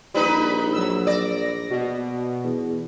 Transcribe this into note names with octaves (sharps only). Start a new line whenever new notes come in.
A#1 G3 D#4 B4 B5
F#3 E6
D5 A#6
B2
E2